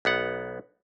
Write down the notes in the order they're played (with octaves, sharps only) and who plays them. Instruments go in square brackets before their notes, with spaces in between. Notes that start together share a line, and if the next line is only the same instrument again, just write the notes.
[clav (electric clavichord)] B1 B3 F#5